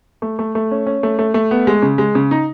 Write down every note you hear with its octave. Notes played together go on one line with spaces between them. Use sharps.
A3
A3
A3
C#4
C#4
A3
A3
A3
B3
G#3
C#3
G#3
C#3
D#4